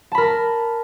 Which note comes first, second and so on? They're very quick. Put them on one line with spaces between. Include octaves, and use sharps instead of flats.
A5 B5 A#4